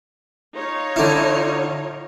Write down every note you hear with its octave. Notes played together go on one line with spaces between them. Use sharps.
D#4 F4 C#5
D3 E4